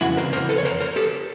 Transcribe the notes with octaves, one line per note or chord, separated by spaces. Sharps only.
F2 C#3 E3 E4 F#4
A#4 C5
A#4 C5
A4 B4
C#5
A#4 C5
A#4 C5
G4 A4